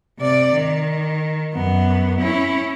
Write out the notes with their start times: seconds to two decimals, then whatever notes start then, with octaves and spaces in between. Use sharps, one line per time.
0.19 C3 D5
0.53 D#3
1.54 F#2 B3
2.21 C#4 E4